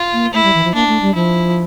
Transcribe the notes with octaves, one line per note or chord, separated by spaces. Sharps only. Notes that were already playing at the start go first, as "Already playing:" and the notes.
Already playing: F4
A#3
A3 E4
G3
E3
F3
A#3 D4
A3
G3
F3 E4